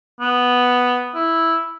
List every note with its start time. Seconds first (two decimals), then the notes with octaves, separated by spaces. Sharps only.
0.20 B3
1.15 E4